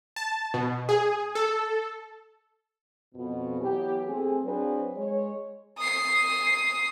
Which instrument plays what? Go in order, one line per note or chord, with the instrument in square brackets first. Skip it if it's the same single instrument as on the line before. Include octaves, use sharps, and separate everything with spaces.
[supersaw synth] A5
B2
G#4
A4
[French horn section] F2 B2
E3 F#3 B3 G4
A3 C4 G#4
F#3 C4 D4 G#4 B4
G#3 C#5
[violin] D#6 C7